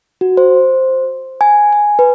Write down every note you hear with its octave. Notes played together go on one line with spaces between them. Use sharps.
F#4
C5
G#5
G#5
B4